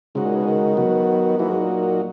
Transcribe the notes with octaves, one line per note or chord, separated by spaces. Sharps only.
G#2 C#3 G#3 D#4 F#4
A#2
B2
D#3
F#3 B3 F#4
E3 F#3 A#3 D#4 F#4
G#2
A#2